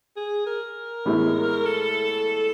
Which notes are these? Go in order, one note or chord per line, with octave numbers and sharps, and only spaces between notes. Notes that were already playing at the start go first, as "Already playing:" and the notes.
G#4
A#4
A2 E3 G#3 B3 E4
A4